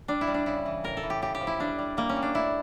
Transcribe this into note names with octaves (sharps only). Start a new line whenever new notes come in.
G3 D4
E4
G3
D4
C#3 E4
E3
A2 A#4
A4
E3
G4
C#3 G4
G4
F3
E4
G3 D4
G3
G3 A#3
C#4
G3
D4
A3 E4